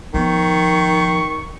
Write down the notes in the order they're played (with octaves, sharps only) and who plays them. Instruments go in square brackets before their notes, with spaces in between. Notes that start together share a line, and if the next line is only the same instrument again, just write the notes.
[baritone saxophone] D#3 [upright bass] F3 B3 [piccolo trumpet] C#6